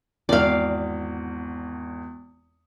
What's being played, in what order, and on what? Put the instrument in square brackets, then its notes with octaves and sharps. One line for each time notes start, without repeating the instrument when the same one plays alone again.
[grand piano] G#1 E2 [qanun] D5 F5